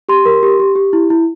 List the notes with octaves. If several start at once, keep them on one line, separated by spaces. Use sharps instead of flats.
G4 C6
A#4
G4
G4
G4
E4
E4